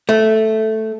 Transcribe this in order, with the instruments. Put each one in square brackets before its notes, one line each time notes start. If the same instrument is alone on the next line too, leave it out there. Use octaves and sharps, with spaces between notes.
[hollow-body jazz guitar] A3